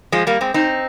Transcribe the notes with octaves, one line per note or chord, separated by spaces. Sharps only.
F3 G#3
G3 A#3
G#3 C4
C4 D#4